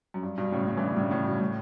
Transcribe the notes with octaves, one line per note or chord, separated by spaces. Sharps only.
F#2
G2
G2 B2
A2 C#3
A2 C#3
E3
B2 D3
A2 C#3
A2 C#3
G2 B2
A2